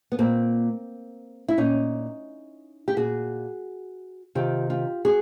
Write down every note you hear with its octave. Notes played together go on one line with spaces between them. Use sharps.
B3
A#2 A#3 C4
E4
A#2 C#4 D#4
G4
A#2 F#4 G#4
C3 D#3 F4 G4
F4 G4
F#4 G#4